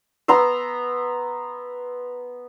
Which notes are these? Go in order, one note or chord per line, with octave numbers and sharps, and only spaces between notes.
B3 A#5 C6 E6